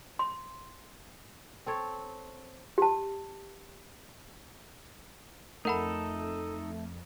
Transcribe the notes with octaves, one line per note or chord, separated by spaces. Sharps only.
C6
C4 A4 C#5
G4 A5
F2 A3 D#4 A4 A#4 F#5 B5